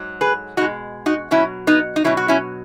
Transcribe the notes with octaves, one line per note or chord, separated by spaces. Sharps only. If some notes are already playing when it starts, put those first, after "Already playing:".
Already playing: G#2 F#3
G#4 B4
B2 G#3 D#4 F#4
D#4 F#4
B2 F#3 C#4 E4
B3 D#4
D#4
B2 F#3 C#4 E4
F#4
C#4 E4